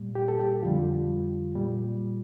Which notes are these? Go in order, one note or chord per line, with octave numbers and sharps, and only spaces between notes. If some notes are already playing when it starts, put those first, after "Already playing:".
Already playing: A#2 G3
G4
A4
G4
F2 D3 G3 F4
A#2 G3